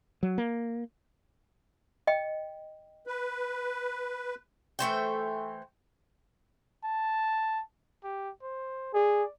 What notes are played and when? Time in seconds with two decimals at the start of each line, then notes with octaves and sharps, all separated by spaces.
0.23 F#3
0.38 A#3
2.07 D#5 G5
3.07 B4
4.79 E3 A3 C5 G5
6.84 A5
8.04 G4
8.43 C5
8.94 G#4 D5